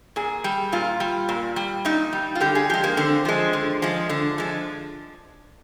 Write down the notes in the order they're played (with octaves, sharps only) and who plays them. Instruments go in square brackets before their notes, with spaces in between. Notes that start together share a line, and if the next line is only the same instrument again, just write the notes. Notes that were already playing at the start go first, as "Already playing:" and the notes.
[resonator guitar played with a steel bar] A#2 G#4
G3
A#2 F4
G3
A#2
G3
A#2 D#4
G3
F4
D3 G4
G#4
F3 G#3 G4
A#3
D3 C4
F3 G#3
D3
F3 G#3
D3
F3 G#3